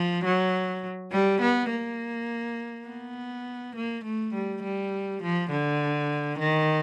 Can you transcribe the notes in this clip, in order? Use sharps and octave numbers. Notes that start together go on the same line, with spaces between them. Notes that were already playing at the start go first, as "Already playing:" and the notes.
Already playing: F3
F#3
G3
B3
A#3
B3
A#3
A3
G3
G3
F3
D3
D#3